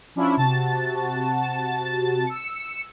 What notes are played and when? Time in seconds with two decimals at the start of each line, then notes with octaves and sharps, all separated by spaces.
0.15 F3 C#4 D4 E4 F4
0.37 C3 F#4 A5 A6
2.27 E6 C#7